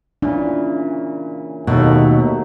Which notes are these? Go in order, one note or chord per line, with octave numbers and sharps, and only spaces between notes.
A#2 C#3 E3 D4
D#2 B2 F#3 A3